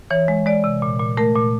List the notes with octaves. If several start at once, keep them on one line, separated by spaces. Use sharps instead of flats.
E3 C#5
G#3
G#3 D5
C3
A#2
A#2
A3 A#4
A#2